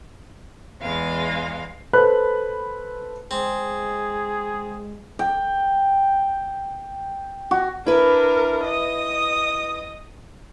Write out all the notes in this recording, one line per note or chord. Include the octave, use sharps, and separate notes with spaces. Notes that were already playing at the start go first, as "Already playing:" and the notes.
E2 G#3 F5
A4 B4 C5 B5 F#6
G#3 C4 G#4
G5
F#4
D4 E4 A#4 B4
D#5 D#6